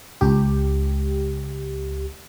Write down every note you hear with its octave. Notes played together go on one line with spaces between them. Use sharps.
C#2 G4